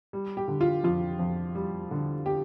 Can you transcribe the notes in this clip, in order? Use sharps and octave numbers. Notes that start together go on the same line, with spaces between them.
G3
G4
D3
F4
F2 F4
F2
G3
D3
G4